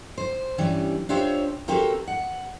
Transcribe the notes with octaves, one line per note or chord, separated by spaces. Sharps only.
C5
G2 E3 C#4 G4 D5
D4 F4 G4 C5 C#5 E5
C4 F#4 G4 A4 A#4 C5
F#5